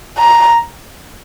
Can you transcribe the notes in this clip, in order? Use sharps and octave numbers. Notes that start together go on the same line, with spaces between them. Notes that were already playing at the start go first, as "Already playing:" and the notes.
A#5